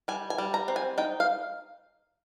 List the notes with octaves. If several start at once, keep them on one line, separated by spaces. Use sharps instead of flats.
G3 G#5
G#5
G3
A#5
C4
G#5
D#4 G5
F5